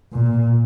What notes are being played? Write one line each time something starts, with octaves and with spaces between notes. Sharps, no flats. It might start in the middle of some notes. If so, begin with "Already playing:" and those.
A#2